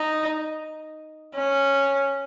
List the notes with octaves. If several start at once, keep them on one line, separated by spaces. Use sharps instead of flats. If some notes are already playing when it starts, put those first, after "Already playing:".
Already playing: D#4
C#4